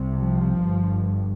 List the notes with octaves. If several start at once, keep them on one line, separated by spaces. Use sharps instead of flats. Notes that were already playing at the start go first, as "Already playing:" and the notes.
Already playing: C2 C3
F3
G1 G2